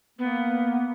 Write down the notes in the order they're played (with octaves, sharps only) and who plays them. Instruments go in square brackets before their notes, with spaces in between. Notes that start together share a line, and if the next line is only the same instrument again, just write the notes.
[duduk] A#3 [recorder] B3